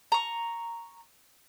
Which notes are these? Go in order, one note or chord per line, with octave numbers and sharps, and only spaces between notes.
A#5 C#6